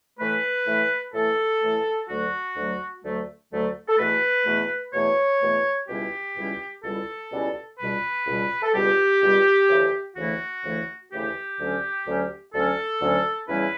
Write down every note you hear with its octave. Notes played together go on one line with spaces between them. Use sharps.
A2 E3 A3 B4
A2 E3 A3
A2 E3 A3 A4
A2 E3 A3
D2 D3 F#3 A3 F#4
D2 D3 F#3 A3
D2 D3 F#3 A3
D2 D3 F#3 A3
A4
E2 B2 A3 B4
E2 B2 A3
E2 B2 A3 C#5
E2 B2 A3
C#2 B2 G3 C#4 E4 G4
C#2 B2 G3 C#4 E4
C#2 B2 G3 C#4 E4 A4
C#2 B2 G3 C#4 E4
C#2 B2 G3 B4
C#2 B2 G3
A4
C#2 B2 G3 G4
C#2 B2 G3
D2 C#3 E3 A3 E4
D2 C#3 E3 A3 E4 F#4
D2 C#3 E3 A3 E4
D2 C#3 E3 A3 E4 G4
D2 D3 F#3 C#4
D2 D3 F#3 C#4
D2 D3 F#3 C#4 A4
D2 D3 F#3 C#4
E2 C#3 G3 C#4 E4 B4